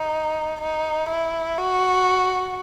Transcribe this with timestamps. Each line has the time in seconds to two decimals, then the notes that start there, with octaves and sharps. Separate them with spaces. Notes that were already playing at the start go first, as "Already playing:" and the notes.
Already playing: D#4
0.61 D#4
1.09 E4
1.58 F#4